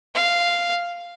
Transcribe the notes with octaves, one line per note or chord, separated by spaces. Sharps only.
F5